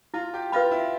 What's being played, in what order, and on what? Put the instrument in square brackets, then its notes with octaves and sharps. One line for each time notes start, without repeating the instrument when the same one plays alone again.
[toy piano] E4 [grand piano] F4
[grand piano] G4
[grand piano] F4 [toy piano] B4 F5 B5
[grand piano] E4